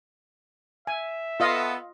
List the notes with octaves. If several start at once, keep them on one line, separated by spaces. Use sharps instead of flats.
E5 G#5
B3 F4 A4 D#5 F5